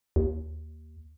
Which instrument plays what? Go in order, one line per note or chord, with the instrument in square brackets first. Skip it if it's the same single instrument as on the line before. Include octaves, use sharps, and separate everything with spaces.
[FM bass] D#2